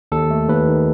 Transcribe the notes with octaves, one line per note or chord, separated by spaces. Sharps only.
D#2 A4
A3
D#2 B4
D#3